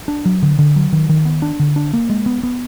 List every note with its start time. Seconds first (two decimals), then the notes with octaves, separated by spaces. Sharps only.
0.08 D4
0.26 F#3
0.43 D3
0.59 D3
0.76 F#3
0.93 D#3
1.09 D#3
1.25 B3
1.42 D4
1.60 D3
1.76 D4
1.93 A#3
2.10 G#3
2.26 B3
2.43 B3